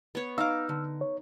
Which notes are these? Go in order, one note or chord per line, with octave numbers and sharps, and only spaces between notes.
B3 C#5
D#4 F5 D6 E6 F6
D3
C#5